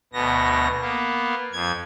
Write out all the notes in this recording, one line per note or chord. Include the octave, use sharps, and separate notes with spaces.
D2 B2 B3 A#6
A#3 B3
F2 G#6